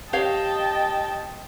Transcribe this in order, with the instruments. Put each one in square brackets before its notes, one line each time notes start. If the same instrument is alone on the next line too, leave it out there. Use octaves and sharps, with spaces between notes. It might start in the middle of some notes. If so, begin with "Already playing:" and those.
[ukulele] G4 C#5 F5 [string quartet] D#5 G5 A5